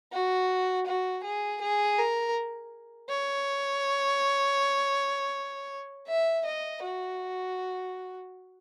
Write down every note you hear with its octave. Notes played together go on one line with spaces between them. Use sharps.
F#4
F#4
G#4
G#4
A#4
C#5
E5
D#5
F#4